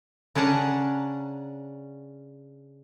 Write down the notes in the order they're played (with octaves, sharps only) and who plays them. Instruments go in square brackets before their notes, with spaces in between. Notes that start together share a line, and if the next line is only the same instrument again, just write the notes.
[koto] C#3 C#4 D4 F#5 A5 A#5